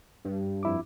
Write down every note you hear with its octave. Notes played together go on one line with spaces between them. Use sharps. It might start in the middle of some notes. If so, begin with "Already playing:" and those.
G2
F2 E4 D6